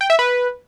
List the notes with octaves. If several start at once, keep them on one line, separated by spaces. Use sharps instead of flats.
G5
E5
B4